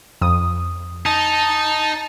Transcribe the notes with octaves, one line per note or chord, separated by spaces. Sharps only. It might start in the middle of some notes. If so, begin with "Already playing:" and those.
F2 D#6
D#4 A5